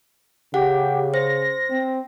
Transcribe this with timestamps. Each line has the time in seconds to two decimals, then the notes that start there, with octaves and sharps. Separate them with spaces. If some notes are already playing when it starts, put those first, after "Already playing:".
0.54 C#3 G4 F#5
1.14 C5 A#6
1.69 C4